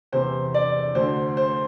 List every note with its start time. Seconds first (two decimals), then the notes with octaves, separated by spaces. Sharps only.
0.12 E2 C3 E3 C5
0.54 D5
0.95 D2 D3 C5
1.37 C5